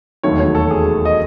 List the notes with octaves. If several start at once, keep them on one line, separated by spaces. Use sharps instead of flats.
E1 D#2 D#3 F#3 A3 C#5
C#5
A4
G#4
D#5